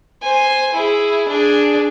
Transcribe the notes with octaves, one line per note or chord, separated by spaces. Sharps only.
C5 G#5
E4 G#4
D4 G#4